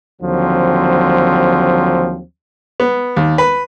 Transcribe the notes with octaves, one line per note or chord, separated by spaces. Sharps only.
D#2 D3 F3 F#3 C4
B3
D#2
B4